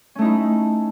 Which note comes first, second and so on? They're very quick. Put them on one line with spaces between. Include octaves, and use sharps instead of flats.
C#4 A3 D#4 E4